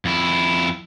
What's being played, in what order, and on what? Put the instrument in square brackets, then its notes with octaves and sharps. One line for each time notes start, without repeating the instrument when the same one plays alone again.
[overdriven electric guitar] F2 E4